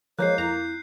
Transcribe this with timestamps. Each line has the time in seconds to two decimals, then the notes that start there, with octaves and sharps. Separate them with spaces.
0.19 F3 G#3 A#3 C#5 F#6 G6 C7
0.38 F2 E4 A#5 G6 C7